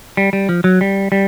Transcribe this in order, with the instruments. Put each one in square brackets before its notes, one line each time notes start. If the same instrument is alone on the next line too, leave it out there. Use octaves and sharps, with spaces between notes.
[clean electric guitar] G3
G3
F3
F#3
G3
G3